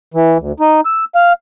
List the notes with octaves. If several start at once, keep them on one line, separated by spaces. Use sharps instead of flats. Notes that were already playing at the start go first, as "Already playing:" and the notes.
E3
D2
D#4
E6
F5